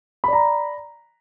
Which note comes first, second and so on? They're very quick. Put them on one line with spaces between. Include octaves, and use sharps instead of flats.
B5 D5 A#5